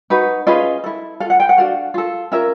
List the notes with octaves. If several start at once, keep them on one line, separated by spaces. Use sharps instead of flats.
D#4 F#4 B4
C#4 F4 G#4 B4 D#5
E4 A4
F4 A4 F5
F#5
G5
F#5
D4 F#4 A4 F5
F4 A4
C#4 F4 A#4 E5